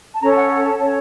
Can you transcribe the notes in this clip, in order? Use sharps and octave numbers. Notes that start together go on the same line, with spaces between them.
A5
C#4 A4 C#5 A#5
A5
F#5
F#5
A5
C#4 A4 C#5 A5